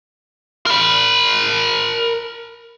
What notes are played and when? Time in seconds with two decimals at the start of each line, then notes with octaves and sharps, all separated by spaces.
0.66 A#4 B5